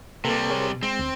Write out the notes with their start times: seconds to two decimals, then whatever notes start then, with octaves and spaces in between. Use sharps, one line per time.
0.25 C3 G3 A#3 A4 B4
0.50 G#4 A#4 C#5
0.71 B2
0.83 G#3 C4
0.99 D2